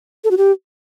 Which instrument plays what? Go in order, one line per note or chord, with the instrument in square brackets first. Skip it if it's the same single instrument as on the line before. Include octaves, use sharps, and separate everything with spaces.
[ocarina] A4
F#4
G4